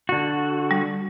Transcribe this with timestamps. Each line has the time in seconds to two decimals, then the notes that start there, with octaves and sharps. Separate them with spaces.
0.09 D3 F#4
0.71 G3